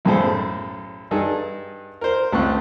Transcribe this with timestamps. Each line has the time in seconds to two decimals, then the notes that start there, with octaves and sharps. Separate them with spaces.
0.05 B1 F#2 A2 G#4 A4 C5
1.11 G2 D#4 G#4 A4
2.01 A#4 C5
2.32 C#2 A3 C4 C#6 F#6